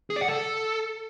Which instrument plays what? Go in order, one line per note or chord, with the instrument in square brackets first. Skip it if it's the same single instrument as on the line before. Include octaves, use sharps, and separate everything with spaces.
[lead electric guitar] G#4
D5
F#5
A4